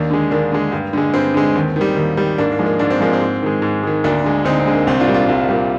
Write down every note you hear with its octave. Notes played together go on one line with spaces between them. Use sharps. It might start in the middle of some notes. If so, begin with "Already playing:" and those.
Already playing: D#2 A#3 D4
D3 G#3
D#2 A#3 D4
D3 G#3
G2
D3 G#3
G2 C4
D3 G#3
D#2
D#3 G3
D#2 A#3
D#3 G3
G#2 A#3 D4
A#3
F3 G#3
A#3
G#2 D4
C4
F3 G#3 A#3
C4
G#2
D#3 G#3
G#2
D#3 G#3
D2 A#3 D4
D3 G#3
D2 C4 D#4
C4
D3 G#3
A#3
C2 C4
D4 F4
A#2 G3
D4 F4
C2 D4 F4
A#2 G3